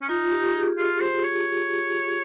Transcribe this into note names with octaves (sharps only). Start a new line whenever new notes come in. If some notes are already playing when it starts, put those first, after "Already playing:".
C#4
D#4 F4
G4
G#4
F4
C5
C#5